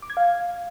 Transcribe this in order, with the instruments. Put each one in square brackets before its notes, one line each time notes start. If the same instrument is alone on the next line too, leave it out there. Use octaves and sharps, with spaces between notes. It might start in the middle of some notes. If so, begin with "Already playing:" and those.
[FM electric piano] D6
G#6
F5